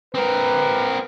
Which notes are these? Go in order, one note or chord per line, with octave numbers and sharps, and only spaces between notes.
C4 A#4 B4